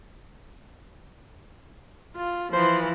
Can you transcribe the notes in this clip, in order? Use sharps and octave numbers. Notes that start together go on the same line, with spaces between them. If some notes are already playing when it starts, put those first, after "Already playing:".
F4
E3 F3 C5